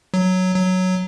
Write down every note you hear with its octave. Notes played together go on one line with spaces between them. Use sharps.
F#3
F#3